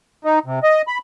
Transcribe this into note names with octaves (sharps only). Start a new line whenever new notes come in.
D#4
C3
D#5
B5